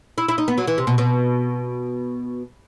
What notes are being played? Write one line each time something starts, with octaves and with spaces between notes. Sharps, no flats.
E4
E4
D#4
B3
F#3
E3
C3
B2
B2